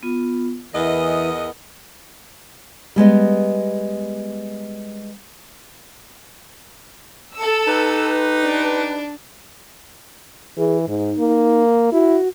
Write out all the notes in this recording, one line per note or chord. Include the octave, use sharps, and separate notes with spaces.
B3 F4
E2 E3 B3 A#4 D#5
G3 G#3 B3 D#5
A4 E6
D#4 G4 B4
D4
E3 G#4
G#2 D#4
A#3
E4 F#4